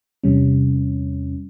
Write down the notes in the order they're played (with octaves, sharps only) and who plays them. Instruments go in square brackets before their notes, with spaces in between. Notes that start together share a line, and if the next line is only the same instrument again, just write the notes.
[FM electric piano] E2 C3 G3 C#4